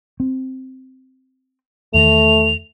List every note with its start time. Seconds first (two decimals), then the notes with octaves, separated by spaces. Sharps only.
0.20 C4
1.94 E2 D#3 A3 F7